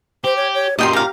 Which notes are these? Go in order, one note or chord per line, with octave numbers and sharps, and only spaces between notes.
G4 C5
C#5
C#5
F#2 A#2 G4 D#5 G5 C6
F5 A#5